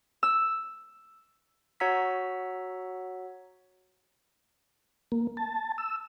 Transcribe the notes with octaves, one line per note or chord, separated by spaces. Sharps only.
E6
F#4 C#5 F#5 A#5 E6 B6
A#3
A5
E6